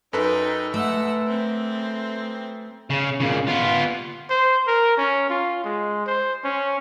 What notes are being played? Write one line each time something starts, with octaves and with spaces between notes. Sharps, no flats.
F#2 D#4 A4 B4 G5
A3 F#5 E6
C4
C#3
A#2 C#3
B3 F4
C5
A#4
C#4
F4
G#3
C5
C#4